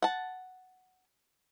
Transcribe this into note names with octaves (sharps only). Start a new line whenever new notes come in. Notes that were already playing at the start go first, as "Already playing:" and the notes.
F#5 A5